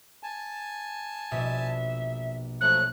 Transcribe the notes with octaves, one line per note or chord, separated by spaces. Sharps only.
G#5 A5
A#1 B2 D4 E5
F3 F#3 A3 F#6